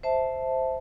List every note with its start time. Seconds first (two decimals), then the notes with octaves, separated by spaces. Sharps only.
0.03 C5 E5 A5